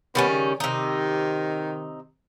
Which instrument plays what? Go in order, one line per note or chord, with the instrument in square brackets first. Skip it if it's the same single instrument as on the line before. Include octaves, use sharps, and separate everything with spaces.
[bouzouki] D#3 G3 C#4 [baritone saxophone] B3
[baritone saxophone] C#3
[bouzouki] C3 D#4 [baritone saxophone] D#3